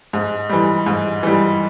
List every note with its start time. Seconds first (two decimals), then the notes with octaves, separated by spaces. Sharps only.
0.13 G#2
0.49 E3 G3
0.86 G#2
1.23 E3 G3